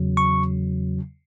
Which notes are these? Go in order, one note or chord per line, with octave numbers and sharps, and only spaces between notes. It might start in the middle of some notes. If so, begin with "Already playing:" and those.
Already playing: E2 C#3 F#3
C#6